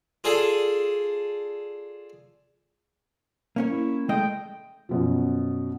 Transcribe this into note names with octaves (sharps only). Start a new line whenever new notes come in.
F4 G#4 A4 D5
A#3 C#4 C#5
E4
G#3 A3 D#5 G5
F#2 B2 F3